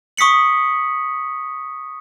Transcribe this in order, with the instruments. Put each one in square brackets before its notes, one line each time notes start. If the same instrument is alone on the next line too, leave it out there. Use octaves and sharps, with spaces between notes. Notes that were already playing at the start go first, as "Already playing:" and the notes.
[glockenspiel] C#6 D#6 B6 C#7 F#7